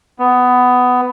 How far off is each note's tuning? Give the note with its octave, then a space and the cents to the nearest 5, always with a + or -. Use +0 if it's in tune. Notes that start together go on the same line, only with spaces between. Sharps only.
B3 +15